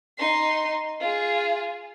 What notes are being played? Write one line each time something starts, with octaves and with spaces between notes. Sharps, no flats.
D#4 C6
F4 G#4